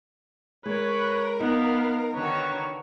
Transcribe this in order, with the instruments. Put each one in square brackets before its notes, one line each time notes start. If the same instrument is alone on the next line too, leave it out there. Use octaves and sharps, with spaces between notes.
[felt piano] G#3 [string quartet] A#4 [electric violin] B4 [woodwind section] C#5
[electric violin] B3 F5 [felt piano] D#4 [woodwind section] B4
[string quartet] D3 D#3 F#4 [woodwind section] B4 [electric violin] C#5